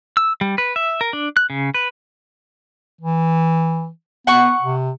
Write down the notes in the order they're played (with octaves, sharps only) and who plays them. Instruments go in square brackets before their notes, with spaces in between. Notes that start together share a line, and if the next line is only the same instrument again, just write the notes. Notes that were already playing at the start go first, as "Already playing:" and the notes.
[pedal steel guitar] E6
G3
B4
E5
A#4
D4
F#6
C#3
B4
[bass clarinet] E3
[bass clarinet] B3 [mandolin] F#5 C#6
[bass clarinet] C3